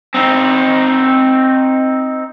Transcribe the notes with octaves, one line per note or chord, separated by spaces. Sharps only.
C4 D#4